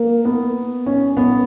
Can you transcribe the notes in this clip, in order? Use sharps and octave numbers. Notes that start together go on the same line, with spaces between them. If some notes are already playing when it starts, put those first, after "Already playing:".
Already playing: A#3
B3
C#4
B3